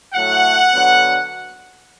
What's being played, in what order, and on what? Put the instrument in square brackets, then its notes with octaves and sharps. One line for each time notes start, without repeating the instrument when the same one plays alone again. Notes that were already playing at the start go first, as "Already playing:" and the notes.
[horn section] A2 F#3 A3 F#5
D3 F#3 B3